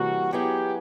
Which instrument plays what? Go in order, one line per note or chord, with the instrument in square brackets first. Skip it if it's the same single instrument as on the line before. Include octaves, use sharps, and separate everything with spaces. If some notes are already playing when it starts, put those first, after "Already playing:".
Already playing: [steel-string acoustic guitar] C3 E3 G3 A#3 [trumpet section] F#4
[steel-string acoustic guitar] F#3 B3 E4 G#4 [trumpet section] G4